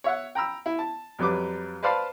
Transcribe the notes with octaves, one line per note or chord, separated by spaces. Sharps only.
C#5 E5 F#5
G5 A#5 B5 E6
E4
A5
F2 F#3 G3 B4 D6
B4 C5 D5 F5 A5 B5